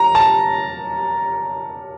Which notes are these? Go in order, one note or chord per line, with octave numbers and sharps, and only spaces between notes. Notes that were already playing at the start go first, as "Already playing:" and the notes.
Already playing: A#5
A5